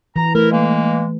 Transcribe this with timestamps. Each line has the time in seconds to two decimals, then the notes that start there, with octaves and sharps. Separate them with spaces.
0.16 E3 A#5
0.35 A3 E4 A#4
0.51 E3 G#3 A#3